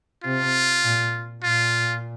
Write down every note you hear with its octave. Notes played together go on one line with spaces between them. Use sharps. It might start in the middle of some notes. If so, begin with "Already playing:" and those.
C3 F4
A#2
A#2 F4